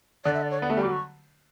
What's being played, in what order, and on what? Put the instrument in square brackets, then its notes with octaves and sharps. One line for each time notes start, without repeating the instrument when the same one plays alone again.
[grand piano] D3 [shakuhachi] D5
[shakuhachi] E5
D5
C#5
[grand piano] B3 [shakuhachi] D5
[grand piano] A3 [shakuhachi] E5
[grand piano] G3
[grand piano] F#3 [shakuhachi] D6
[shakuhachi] C#6